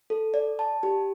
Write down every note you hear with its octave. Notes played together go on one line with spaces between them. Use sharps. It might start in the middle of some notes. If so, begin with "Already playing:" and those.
A4
D5
A5
G4